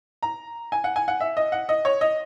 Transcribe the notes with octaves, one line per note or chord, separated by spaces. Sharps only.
A#5
G#5
F#5
G#5
F#5
E5
D#5
F#5
D#5
C#5
D#5